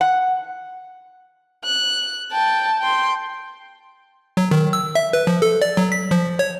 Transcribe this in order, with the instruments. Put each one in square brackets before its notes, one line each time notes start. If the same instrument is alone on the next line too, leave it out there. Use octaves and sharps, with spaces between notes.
[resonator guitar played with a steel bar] F#5
[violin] F#6
G5 A5
G5 C6
[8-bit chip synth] F#3
D#3
E6
E5
B4
F3
A4
D5
F#3
B6
F3
C#5